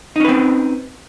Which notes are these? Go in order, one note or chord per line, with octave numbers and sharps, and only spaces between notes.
C4 C#4 D#4 B4